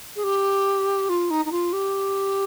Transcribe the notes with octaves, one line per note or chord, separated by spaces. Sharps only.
G#4
G4
F4
D#4
D#4
F4
G4